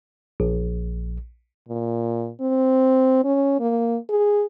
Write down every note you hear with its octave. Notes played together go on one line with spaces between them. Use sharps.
A#1
A#2
C4
C#4
A#3
G#4